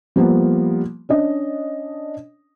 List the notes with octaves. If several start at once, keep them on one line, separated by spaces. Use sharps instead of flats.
F3 G3 A#3 B3
C#4 D4 D#5